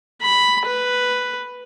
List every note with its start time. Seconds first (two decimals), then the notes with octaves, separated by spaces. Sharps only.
0.22 B5
0.66 B4